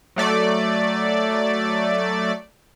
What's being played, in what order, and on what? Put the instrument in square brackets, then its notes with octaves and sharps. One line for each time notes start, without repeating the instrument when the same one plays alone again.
[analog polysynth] F#3 A3 D5